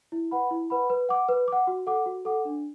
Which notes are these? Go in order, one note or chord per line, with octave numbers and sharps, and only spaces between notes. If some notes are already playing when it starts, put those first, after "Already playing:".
E4
B4 F#5 B5
E4
B4 F#5 B5
B4
F#5 D6
B4
F#5 D6
F#4
A4 F#5 D6
F#4
A4 F#5 D6
D4